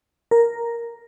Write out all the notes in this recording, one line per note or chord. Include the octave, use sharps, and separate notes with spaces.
A#4